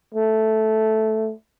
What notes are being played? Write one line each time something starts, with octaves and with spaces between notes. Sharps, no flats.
A3